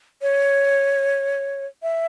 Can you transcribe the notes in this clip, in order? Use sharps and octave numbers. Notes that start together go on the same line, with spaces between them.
C#5
E5